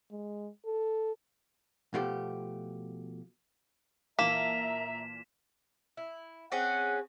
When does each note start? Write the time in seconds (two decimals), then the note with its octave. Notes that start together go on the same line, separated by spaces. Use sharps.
0.11 G#3
0.65 A4
1.94 B2 F3 A3 G4
4.19 A#2 E3 A#3 E5 A5 A#5 B6 E7
5.97 E4
6.52 C4 C#4 G#4 F#5